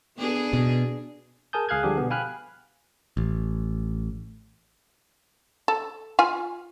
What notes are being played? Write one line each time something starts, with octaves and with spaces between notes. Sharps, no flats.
B3 D4 G#4
B2
G#4 A#4 G#5 A5 D#6 G6
C#2 G#4 F5 F6 F#6 G#6
D3 F3 G3 D4 G4 G#4
B2 B3
F5 G5 G#5 B5 F6 F#6
A1
A4
F4 G#5